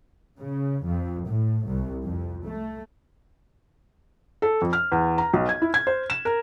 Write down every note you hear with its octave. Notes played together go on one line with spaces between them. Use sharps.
C#3
F2
A2
C2
F2
A3
A4
F2
F6
E2
A#5
B1
G#6
E4
G#6
C5
E7
A#4